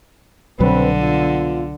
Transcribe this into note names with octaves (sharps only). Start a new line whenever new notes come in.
C2 B2 D3 F#3 C4 B4
B3 F4